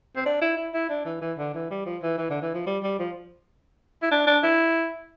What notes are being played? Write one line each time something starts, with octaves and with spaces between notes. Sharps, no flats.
C4
D4
E4
E4
E4
D4
E3
E3
D3
E3
G3
F3
E3
E3
D3
E3
F3
G3
G3
F3
E4
D4
D4
E4